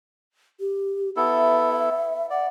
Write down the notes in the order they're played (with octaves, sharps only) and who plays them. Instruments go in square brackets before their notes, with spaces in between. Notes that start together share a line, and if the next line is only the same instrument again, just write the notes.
[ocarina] G4
[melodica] B3 E4 A4 [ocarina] E5
[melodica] D5 [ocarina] F#5